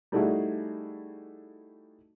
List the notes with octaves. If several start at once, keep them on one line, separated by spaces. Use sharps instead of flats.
G3 A3 D#4 E4 F#4 G#4